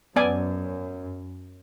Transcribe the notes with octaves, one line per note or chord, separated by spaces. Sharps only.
F#2 B3 D5 G#5